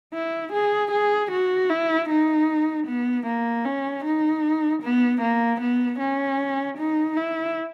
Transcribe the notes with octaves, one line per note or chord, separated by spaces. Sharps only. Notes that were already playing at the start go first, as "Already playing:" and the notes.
E4
G#4
G#4
F#4
E4
D#4
B3
A#3
C#4
D#4
B3
A#3
B3
C#4
D#4
E4